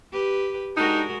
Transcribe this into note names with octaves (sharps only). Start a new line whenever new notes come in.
G4 B4
G#3 D4 D#4 F#4 G4 A#4